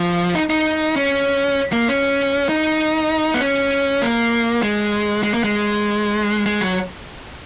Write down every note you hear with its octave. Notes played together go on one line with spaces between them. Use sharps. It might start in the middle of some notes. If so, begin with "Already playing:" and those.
Already playing: F3
D#4
D#4
C#4
A#3
C#4
D#4
B3
C#4
A#3
G#3
G#3
A#3
G#3
G#3
F#3